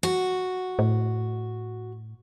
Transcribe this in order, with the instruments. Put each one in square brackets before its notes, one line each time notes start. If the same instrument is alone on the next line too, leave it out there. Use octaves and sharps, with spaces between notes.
[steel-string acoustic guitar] F#4
[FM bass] A2